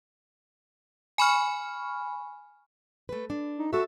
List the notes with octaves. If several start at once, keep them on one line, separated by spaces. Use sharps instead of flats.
G#5 B5 C#6 F6
A3 B4
D4
D#4
F#4 A4 E5